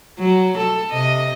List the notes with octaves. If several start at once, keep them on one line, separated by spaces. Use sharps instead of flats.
F#3
A4
C3 D#5